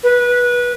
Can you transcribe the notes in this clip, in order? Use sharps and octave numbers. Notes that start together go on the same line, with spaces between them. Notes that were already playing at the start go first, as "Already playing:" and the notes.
B4